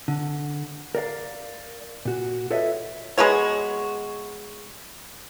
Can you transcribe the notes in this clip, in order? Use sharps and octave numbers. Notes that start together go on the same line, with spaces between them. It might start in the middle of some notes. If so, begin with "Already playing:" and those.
D3
A#4 D5 F5
A#2 F#4
F4 A4 B4 C#5 D#5 E5
G#3 B3 F#4 C#5